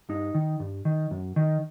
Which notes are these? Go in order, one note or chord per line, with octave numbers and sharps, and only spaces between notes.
G2 D#4
D#3
G2
D#3
F#2
D#3